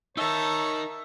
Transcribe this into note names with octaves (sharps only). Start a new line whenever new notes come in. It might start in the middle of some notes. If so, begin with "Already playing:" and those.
D#4 A#4 C#5 E5 A5 A#5